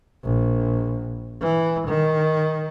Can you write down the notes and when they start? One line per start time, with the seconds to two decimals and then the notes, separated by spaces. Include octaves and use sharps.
0.24 A#1
1.42 E3
1.87 D#3